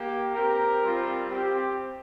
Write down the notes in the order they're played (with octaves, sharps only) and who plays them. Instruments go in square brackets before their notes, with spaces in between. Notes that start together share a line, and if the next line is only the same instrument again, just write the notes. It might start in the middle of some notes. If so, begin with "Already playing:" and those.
Already playing: [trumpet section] A#3 G4
C4 G4 A#4
G3 C4 F4
C4 G4